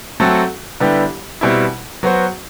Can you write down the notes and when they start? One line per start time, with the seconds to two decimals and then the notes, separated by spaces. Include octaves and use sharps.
0.20 F#3 A3 C4 F#4 A4
0.80 D3 G3 B3 E4 G4
1.41 B2 G3 C4 E4
2.03 F#3 B3 F#4 C5